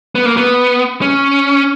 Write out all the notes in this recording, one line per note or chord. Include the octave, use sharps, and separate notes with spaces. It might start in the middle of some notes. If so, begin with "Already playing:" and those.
B3
A#3
B3
C#4